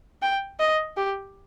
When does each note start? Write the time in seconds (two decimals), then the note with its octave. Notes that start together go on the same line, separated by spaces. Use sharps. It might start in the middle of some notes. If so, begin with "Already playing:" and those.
0.22 G5
0.59 D#5
0.97 G4